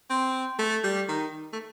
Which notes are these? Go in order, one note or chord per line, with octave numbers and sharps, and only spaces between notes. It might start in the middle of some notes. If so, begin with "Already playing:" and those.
C4
A3
G3
D#3
A3